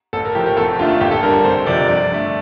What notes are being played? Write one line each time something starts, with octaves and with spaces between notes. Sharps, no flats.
A1 A4
A#4
A2 F3 G4
A#4
F1 A4
D#2 D3 A3 F4
A1 G4
A4
G2 D3 G3 A#4
F1 C5
F2 C3 F3 D5
G2 D5
D3 A3